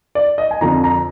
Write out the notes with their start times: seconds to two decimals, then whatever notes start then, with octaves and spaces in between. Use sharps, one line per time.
0.15 D5
0.38 D#5
0.51 G#5
0.61 F2 D3 F3 A#5
0.84 A#5